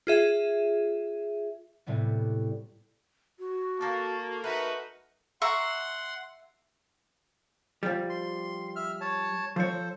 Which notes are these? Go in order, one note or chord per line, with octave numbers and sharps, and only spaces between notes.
F4 G#4 E5
A2 C3 G3 B3
F#4
A#3 A4 D5 A5
A3 D#4 F#4 A#4 B4
E5 F#5 A#5 C6 C#6
F3 G3
C6
E5 F6
C#5 A5
F3 A4 C5 C#5